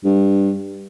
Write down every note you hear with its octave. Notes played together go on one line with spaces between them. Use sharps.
G2